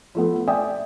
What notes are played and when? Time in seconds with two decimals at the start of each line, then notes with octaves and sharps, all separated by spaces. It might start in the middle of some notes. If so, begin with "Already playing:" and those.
0.15 F3 A3 B3
0.48 D5 E5 G5 G#5 D#6